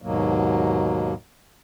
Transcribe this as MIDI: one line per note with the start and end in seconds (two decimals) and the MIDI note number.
0.02 1.13 39
0.02 1.13 44
0.02 1.13 47
0.02 1.13 54
0.02 1.13 58